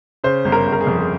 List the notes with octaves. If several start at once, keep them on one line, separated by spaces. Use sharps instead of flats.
C#3 C5
G1
A#4
G1
A#4
G#4
F2
G#4